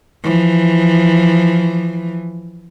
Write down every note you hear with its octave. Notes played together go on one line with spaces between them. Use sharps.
E3 F3